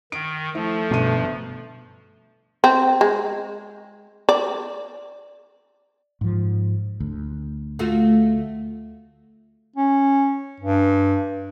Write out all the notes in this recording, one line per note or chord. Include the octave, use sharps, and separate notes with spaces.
D#3 D7
F3 A3 E4
G1 B2 D#7
C4
G#3
D5
G#2 F3
D2
A3 F4 F#4
C#4
G2